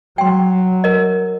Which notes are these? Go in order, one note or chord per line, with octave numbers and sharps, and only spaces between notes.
F#3 G5 C6
A#4 D#5